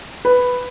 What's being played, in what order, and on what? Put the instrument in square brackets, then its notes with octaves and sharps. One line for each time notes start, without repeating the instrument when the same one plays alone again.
[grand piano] B4